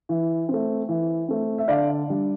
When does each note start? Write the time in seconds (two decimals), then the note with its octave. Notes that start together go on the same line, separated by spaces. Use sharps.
0.09 E3
0.49 A3 C4
0.89 E3
1.28 A3 C4
1.58 E5
1.68 D3 D5 F5
2.08 G3 D4